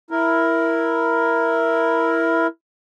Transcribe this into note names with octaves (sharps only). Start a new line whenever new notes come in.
E4 A#4